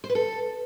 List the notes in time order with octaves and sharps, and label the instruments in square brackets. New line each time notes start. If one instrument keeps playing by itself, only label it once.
[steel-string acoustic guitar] C5
B4
A4